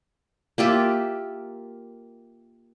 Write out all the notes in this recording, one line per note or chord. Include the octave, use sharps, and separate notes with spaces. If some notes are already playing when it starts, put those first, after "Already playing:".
A#3 F4 G4 E5